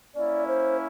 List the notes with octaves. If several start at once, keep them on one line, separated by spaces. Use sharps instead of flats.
A#3 C#4 E4 D5
C5